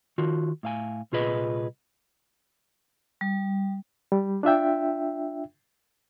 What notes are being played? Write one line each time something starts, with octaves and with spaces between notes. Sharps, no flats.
D#3 F4 F#4
A2 F5 G#5
C2 A#2 F4 G#4 B4 D#5
G3
G3
D4 F4 E5 G5